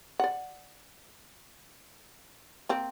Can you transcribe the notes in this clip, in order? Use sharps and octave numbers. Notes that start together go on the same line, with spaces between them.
D5 F#5
A#3 C4